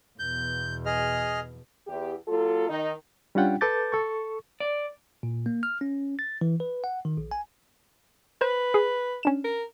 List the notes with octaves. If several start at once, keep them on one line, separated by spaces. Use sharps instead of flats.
E2 B2 G6
G#4 D#5 F6
E2 G4
F#3 A#3 F4 A4
D#3 D#4
G3 C#4 D4 F4 F#5 G5
A4 B4 A5 D6 G6 A6
A4 C#6
D5
A#2
A#3
F6
C#4
A6
E3
B4
F#5
D#3
A#1
G#5
B4 C5
G#4
C#4 D4 E7
A#4